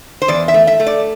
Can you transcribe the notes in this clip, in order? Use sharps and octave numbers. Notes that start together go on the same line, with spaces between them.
C5
E2 D5
E5
A3
E5
A3
D5